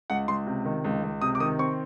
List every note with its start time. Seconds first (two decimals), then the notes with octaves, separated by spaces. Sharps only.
0.10 C#2 F#5
0.28 C#2 C6
0.46 C3
0.65 D#3
0.84 C#2
1.03 C#2
1.21 C3 D#6
1.35 D6
1.40 D#3 D#6
1.59 C4 C#6